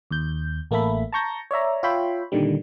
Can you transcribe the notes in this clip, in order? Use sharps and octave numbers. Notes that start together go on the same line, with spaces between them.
D#2 G6
A1 A3 A#3 A4 E5 B5
A5 A#5 C#6 G6 A#6
C#5 D5 E5 A#5
F4 C#5 E5 G5 B5 C6
A#2 D3 D#3 G3